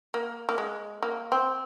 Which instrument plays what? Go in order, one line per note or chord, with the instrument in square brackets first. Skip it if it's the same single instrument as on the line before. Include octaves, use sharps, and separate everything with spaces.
[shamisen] A#3
A#3
G#3
A#3
C4